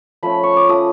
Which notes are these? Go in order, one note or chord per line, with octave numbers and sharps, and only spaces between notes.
F3 A3 C#4 B5
C#6
D6
F3 A3 C#4 D#6